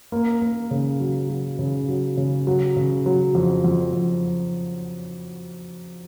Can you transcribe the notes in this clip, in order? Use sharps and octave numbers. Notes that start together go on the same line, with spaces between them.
A#3
A#3
C#3
F#3
F#3
C#3
F#3
C#3
F#3
C#3
F#3
F2
F2
F2